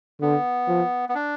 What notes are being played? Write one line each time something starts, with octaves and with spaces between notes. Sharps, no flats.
D3 B3
F3
B3
D4